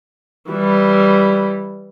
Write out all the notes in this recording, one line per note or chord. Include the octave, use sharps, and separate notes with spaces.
E3 G3